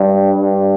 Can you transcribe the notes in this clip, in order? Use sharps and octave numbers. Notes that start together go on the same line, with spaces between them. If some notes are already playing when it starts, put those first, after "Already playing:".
Already playing: G2
G2